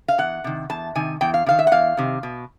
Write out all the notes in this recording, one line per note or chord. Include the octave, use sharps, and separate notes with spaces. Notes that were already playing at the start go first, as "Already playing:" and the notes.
F5
E2 F#5
C3 D#3
E2 A5
C3 D#3 G#5
E2 G5
F5
C3 D#3 F5
E5
F#5
E2 F5
C3 D#3
B2